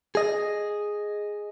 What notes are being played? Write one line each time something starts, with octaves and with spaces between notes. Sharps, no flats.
G#4 D#5